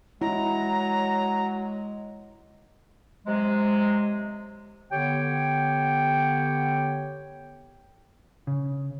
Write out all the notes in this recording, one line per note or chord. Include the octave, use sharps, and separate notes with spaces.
F#3 G#3 E4 A#5
C3 F#3 G#3
D3 B3 G4 C#5 G5
C#3